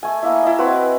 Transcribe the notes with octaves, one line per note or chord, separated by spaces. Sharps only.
A3 G#5
A#3 E4 E5
E4 D#5
C4 F#4 B4 B5